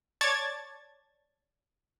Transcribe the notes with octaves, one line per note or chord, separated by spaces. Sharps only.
C#5 D5 A5 G#6 A6